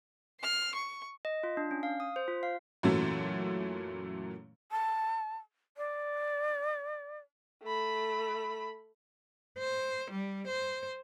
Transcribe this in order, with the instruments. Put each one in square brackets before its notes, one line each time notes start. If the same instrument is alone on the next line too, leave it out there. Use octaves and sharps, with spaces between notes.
[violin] F6 C7
C#6
[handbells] D#5
F4
D4
C#4
F5
D#6
C5
F4
F5
[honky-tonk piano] F#2 A#2 E3 F#3 A3 C#4
[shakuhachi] A5
D5
[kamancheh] A3 B5
[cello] C5
G3
C5